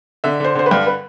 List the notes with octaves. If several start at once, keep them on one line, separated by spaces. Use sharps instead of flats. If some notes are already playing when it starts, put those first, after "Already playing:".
D3 E5
D3 C5
D3 C5
B4
G2
B4